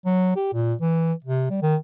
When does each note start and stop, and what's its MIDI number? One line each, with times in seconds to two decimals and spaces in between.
0.05 0.36 54
0.36 0.50 67
0.53 0.74 46
0.81 1.13 52
1.24 1.48 48
1.51 1.58 55
1.62 1.76 51